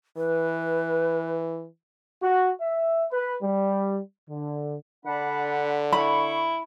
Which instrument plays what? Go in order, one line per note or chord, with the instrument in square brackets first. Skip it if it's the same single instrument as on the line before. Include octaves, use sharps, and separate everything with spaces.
[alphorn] E3 [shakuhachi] B4
[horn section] F#4
E5
B4
G3
D3
[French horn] D3 [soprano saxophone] D4 [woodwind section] F#5 B5
[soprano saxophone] E4 [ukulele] B5 [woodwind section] C#6